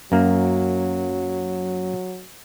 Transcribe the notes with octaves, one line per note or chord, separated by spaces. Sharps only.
F#2 F#3 A#3